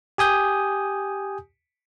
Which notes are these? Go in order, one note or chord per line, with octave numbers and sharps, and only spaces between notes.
G4 G#5 D#6 G6